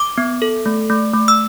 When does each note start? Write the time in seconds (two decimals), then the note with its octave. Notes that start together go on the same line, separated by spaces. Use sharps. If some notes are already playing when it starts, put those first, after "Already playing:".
Already playing: D6
0.18 B3
0.42 A4
0.66 A3
0.90 A3
1.13 A3
1.28 E6